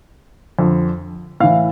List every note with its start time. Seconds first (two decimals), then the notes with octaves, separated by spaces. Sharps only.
0.59 F2 D3
1.40 A2 E3 F5